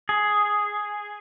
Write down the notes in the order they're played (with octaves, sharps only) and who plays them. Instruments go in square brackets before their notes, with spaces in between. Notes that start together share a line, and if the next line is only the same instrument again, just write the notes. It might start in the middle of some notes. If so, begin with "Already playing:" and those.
[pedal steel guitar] G#4